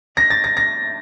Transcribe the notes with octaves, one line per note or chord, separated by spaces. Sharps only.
A#6
A6
A#6
A#6